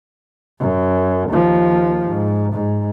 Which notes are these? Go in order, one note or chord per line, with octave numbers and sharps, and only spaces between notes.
F#2
D#2 F3
G#2
G#2